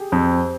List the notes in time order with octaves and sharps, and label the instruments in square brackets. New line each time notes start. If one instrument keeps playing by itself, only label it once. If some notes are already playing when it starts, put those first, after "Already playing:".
Already playing: [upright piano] G4 G#4
[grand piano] F2 [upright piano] C4